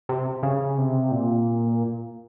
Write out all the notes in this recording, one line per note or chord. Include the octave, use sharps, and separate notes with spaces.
C3
C#3
C3
A#2